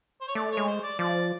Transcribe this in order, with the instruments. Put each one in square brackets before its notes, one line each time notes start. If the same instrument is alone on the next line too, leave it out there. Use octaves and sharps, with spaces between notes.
[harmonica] C5
C#5
[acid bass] A3 [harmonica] D5
[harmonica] C#5
[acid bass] G#3
[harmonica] C5
D5
[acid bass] F3 [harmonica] D5